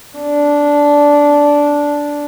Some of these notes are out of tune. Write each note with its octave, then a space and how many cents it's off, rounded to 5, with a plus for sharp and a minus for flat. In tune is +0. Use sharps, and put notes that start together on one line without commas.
D4 -10